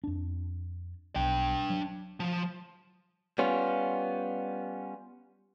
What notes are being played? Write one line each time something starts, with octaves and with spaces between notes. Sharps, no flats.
F2 D4
B1 D4 G5
F#3
F3
G3 B3 C#4 F4